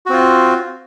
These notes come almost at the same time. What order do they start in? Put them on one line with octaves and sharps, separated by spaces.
F#4 C4 F4